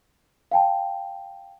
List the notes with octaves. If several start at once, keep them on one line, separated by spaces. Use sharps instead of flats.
F5 G5 A5